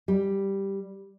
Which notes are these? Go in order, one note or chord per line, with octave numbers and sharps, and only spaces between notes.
G3